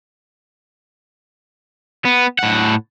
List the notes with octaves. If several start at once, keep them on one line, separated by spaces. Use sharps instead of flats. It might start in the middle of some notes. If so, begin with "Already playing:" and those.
B3
A2 F#5